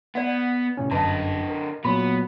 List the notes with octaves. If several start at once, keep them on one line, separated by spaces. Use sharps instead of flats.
B3 D5 F#5
A2 C3 C#4
G1 F#2 D3 B4 D#5 A5
A#4
A#2 F#3 A#3 B3 B5